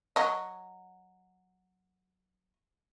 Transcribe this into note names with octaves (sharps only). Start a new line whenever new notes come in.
F#3 D#5